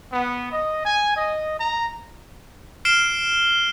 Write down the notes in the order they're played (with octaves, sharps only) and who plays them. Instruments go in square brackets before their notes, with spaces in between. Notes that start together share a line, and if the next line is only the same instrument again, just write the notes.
[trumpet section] B3
D#5
G#5
D#5
A#5
[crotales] F6 C7 D7 E7 G7